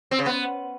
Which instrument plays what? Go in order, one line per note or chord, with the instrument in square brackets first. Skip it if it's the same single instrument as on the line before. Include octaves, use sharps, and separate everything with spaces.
[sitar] C4
C#3
B3